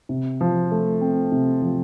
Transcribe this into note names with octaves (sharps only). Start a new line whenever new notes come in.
C3
F3
A3
C4
C3
F3